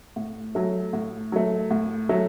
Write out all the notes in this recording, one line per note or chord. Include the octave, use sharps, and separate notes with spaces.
A2
F#3 A3
A2
F#3 A3
A2
F#3 A3